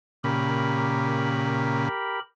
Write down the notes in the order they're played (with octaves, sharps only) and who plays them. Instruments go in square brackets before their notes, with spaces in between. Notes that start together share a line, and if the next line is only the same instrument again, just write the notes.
[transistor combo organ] A#2 C#3 [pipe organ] G4 A#4 B5